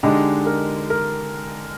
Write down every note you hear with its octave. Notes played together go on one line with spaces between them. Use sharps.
D3 G#3 D4 D#4 G4
A#4
A#4